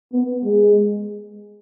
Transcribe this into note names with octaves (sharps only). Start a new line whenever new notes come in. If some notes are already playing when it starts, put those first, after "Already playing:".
B3
G#3